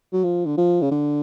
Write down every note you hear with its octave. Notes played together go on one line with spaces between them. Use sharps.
F#3
F3
D3
F3
C#3
D3